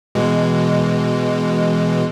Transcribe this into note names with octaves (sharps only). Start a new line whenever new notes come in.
B2 E3 G#3